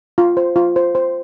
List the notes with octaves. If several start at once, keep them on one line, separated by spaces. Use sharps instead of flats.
F4
C5
F4
C5
C5